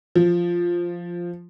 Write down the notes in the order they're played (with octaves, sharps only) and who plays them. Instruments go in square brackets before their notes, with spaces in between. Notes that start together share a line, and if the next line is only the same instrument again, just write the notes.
[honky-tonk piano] F3